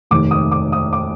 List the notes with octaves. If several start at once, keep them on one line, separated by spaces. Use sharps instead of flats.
F1 D#2 D#3 D6
D#6
D6
D#6
D6